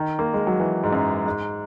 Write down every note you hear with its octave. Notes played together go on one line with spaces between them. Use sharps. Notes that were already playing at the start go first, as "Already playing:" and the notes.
Already playing: D#3
A#3
G#3
F#3
E3
G#2
F#2
G#2